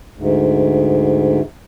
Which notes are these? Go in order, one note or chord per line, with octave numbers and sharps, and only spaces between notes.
D2 G#2